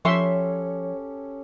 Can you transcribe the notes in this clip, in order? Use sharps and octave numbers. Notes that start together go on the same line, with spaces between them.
F3 C#4 G4 A4 C#5 E5 C6 C#6